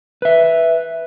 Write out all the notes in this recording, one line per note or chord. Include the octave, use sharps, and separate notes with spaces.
B4 E5